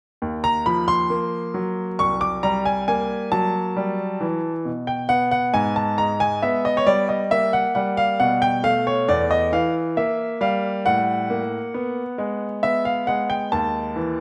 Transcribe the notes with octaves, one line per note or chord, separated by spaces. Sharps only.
D#2
A#5
F3 B5
C6
A#3
F#3
C2 C#6
D6
G3 A#5
G#5
A#3 G#5
F#3 A5
G3
E3
B2
G5
B3 F#5
F#5
G#2 G#5
A5
G#3 A#5
G#5
B3 E5
D#5
C#5
G3 D5
D#5
A#3 E5
F#5
G3 F#5
F5
B2 F#5
G5
A3 F5
C#5
E2 D5
D#5
E3 F5
A#3 E5
G3 F5
A2 F#5
A#3
B3
G#3
B3 E5
F5
G#3 F#5
G5
D#2 A5
E3